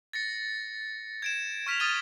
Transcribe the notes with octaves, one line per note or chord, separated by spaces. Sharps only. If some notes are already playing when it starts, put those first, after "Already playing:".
A6 A#6 C#7
G#6 D7 E7
C#6 F6 B6 E7 F7
D#6 F6 A6 D#7 G7